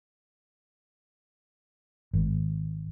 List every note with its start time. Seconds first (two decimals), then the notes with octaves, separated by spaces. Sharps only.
2.13 G#1